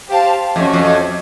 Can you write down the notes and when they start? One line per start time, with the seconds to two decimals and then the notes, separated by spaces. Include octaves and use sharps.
0.09 G4 C5 F5 A5
0.56 F2 A3 C#4 F#4
0.73 F2